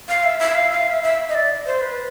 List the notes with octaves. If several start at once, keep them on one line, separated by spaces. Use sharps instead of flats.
F5
E5
E5
F5
F5
E5
E5
D#5
D5
C5
B4